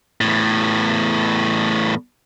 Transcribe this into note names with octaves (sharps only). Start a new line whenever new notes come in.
E2 A2